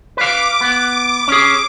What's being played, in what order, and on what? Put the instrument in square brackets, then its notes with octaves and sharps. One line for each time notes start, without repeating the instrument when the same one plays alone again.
[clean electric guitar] B4 F5 [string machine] D6
[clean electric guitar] B3
C#4 G#4